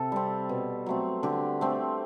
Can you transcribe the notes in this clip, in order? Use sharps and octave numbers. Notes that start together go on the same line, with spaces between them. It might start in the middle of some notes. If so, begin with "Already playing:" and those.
Already playing: C3 A4
G3 C4
B2
F#3 A3 C4
D3 G4
A3 C4